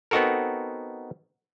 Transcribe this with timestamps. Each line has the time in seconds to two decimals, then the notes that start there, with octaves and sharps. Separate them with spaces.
0.11 B3 C4 D#4 F#4 A4 A#4